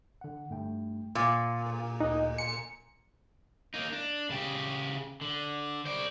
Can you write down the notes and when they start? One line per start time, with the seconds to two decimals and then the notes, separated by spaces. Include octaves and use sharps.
0.21 D3 F#5
0.50 G2 A3 G5
1.15 A#2 C6
2.00 D2 D#4 F#6
2.38 G#5 A#5 C6 C#7
3.74 A#3 D#4
3.93 D4
4.30 C#3 G4
5.21 D3
5.85 C5 D5